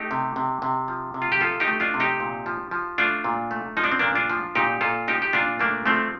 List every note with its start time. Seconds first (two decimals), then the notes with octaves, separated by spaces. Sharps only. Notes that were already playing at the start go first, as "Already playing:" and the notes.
Already playing: A3 D#4 G4
0.11 C3
0.36 C3
0.62 C3
0.88 F3
1.14 C3
1.22 F4
1.32 G4
1.41 F3 F4 A4
1.60 D#4 G4
1.67 A3
1.80 D4 F4
1.94 C3
2.00 D#4 G4
2.20 A#2
2.46 F3
2.71 F3
2.98 A3 D4 F4
3.24 A#2
3.51 A3
3.77 F3 D#4
3.84 D4
3.92 C4
3.99 A#2 A#3 D4
4.15 D4 F4
4.30 F3
4.55 A#2 D#4 G4
4.81 A#2 F4 A4
5.08 F3 D#4 G4
5.22 G4
5.33 A#2 D4 F4
5.59 A3 A#3 D4
5.86 F3 A3 C4